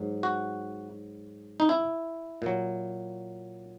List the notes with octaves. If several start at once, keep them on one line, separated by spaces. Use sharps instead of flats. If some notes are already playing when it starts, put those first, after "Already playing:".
Already playing: G#2 F#3
F#4
D#4
E4
A#2 F#3